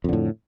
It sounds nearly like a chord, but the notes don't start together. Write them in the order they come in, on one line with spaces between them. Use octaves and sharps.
F2 D3 A2